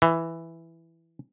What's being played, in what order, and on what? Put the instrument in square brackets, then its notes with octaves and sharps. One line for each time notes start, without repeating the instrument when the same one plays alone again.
[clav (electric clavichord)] E3